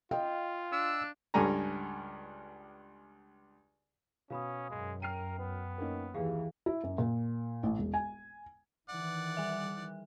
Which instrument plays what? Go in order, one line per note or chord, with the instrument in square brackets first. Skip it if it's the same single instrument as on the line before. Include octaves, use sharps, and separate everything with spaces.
[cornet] F4 [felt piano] D#5 F5 G5
[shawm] D4 [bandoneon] E6
[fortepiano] C#2 G2 A4 G#5 A#5
[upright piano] B2 [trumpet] C#4 [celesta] F5 B5 D#6
[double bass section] F#2 [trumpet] G#3
[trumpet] A#4 [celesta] G5 [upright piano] F6 C7 D#7
[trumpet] B3 [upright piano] B4
[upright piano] A#3 C#4 D#4
[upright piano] D#2 [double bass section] E3 [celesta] G4 G#4 F5
[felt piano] E4
F#2
A#2
A1
E1
G#5
[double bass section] D#3 E3 [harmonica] D5 F#5
[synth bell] G3 E5 F#6